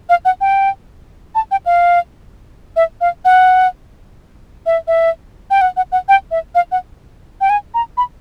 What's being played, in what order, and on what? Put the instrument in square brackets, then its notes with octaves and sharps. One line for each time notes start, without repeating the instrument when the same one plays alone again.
[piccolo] F5
F#5
G5
A5
G5
F5
E5
F5
F#5
E5
E5
G5
F#5
F#5
F#5
G5
E5
F5
F#5
G5
G#5
A#5
B5